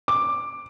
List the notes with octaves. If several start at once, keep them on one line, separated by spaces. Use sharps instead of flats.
D6